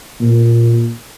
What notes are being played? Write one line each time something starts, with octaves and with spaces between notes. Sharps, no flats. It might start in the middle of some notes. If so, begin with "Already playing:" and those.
A#2